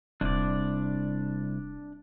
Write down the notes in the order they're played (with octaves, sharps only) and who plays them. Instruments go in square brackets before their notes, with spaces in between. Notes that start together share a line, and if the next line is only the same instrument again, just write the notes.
[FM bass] D#1 [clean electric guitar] C2 [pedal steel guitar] D4 D5